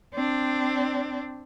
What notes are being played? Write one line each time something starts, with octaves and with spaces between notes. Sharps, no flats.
C4 D4